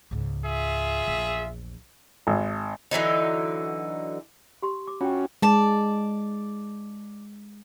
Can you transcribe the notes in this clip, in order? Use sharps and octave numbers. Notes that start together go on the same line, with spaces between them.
C#2 G#2
F4 G#4 E5
A#1 E2
G#1
D3 E3 F#3 D#4
G4 C6
D6
C#4 F4 F#4 G5
G#3 D5 A5